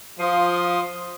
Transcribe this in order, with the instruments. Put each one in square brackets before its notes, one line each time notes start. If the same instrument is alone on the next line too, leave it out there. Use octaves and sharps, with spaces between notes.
[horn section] F3 [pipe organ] C6 D#6